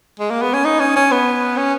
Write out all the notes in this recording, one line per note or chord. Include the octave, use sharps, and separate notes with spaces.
G#3
A#3
B3
C#4
D#4
C#4
C#4
B3
C#4